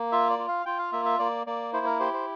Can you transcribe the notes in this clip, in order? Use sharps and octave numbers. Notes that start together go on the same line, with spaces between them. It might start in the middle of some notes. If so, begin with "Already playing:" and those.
Already playing: A#3
F4 E5
D5
F4
F5
F4 G5
F5
A#3 E5
E5
A#3 D5
A#3 D5
E4 C5
A#4
G4 C5
C5